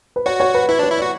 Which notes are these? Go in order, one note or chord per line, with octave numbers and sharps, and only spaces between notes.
B4
F#4 C#5
C#5
B4
E4 B4
D4 C#5
E4
F#4 D5